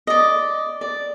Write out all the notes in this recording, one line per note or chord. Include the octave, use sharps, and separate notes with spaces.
D5 D#5
D5